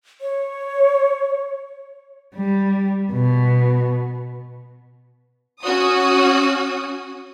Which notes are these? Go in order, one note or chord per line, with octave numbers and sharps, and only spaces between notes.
C#5
G3
B2
C#4 F#4 D#6